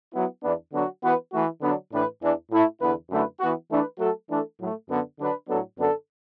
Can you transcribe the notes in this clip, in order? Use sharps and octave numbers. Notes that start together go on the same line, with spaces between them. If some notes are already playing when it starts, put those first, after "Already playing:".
F#3 B3 E4
E2 E3 B3 D4
D3 F#3 B3 D4 F#4
E3 B3 F#4 B4
E3 A3 F#4
D3 F#3 B3 D4
A2 E3 D4 B4
E2 E3 D4
A2 A3 E4
E2 D3 B3 E4 B4
F#2 D3 A3 E4 B4
E3 B3 F#4
E3 A3 D4 B4
F#3 A3 F#4 A4
E3 A3 D4 A4
A2 F#3 A3
F#2 D3 B3
D3 F#3 D4 B4
A2 F#3 B3 D4 A4
F#2 D3 B3 D4 A4